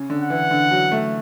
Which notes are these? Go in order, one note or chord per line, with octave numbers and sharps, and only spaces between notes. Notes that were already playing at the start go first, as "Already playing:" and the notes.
Already playing: C#3
D3
F#5
E3
D3
F#3
A3